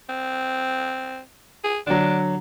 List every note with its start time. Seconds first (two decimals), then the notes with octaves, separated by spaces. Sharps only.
0.09 C4
1.64 G#4
1.87 D3 F#3 D4